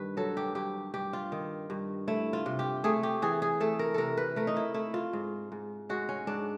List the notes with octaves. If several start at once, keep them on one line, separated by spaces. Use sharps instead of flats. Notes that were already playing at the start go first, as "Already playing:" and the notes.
Already playing: G2 D#3 B4
F#3 A4
G4
G2 G4
G2 G4
F4
D#3
G2
A3 E4
F4
C3
G4
A3 G#4
G4
E3 G#4
G#4
A3 A4
A#4
C3 A4 A#4
B4
A3 A#4
D#4
E4
A3 E4
F4
G#2
G#2
G#3 F#4
C#4
G#2 D4